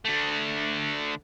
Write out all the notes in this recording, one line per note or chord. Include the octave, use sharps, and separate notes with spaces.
D3 A3